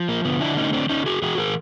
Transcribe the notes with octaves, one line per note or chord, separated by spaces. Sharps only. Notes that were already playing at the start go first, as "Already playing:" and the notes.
Already playing: F3
A#3
D3 B3
D4 E4
A3 C#4 D#4
C4 D4
D3 C#4 D#4
F#4 G#4
E3 F#4 G#4
G#4 A#4